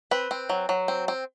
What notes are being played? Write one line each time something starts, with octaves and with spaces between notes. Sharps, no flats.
C4 B4
C4
F#3
F#3
C4
C4